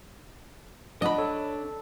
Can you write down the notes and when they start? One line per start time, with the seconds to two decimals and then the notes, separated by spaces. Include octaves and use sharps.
1.02 F3 D4 D#5 F#5 B5
1.18 A4 C#5